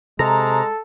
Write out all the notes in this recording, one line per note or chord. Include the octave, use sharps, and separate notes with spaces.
C3 G#3 A4 A#5